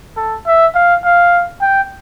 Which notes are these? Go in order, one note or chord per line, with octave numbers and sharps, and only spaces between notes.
A4
E5
F5
F5
G5